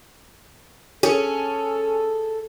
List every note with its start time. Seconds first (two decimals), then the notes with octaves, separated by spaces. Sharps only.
1.03 C#4 G#4 A4